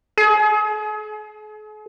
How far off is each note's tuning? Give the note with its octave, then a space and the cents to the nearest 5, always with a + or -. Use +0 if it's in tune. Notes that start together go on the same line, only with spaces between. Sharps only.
G#4 +45